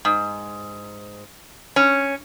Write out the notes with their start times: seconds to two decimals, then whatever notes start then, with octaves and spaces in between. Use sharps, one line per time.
0.05 G#2
1.76 C#4